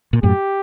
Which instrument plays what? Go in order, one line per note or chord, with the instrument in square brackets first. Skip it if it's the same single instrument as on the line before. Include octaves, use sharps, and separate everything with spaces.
[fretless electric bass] A#2
[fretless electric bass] F#2 A2 [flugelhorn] G4